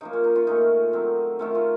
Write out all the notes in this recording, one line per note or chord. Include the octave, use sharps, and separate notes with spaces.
C#3 F3 A#3 D#4
C#4
D#4
C#4 F4
A#2 A3 C#4 D#4
D#3 F#3 C4
D#3 A3 C4 C#4 F4
C#4 F4